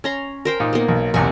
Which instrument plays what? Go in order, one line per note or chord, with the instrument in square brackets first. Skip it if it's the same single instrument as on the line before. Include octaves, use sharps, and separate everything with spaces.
[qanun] C#4 A#5 C6
A#4 C5 G5
[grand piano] A#2 D#4
[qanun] A#3 B3
[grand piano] B1
[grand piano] B1 E2 C3 [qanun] G#5 C#6